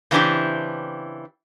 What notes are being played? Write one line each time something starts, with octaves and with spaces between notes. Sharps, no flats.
C#3 E3 C4 D4 E4 G4